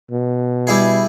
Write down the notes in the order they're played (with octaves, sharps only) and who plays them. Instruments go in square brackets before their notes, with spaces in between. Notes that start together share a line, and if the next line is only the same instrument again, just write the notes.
[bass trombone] B2
[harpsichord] G3 E4 G#4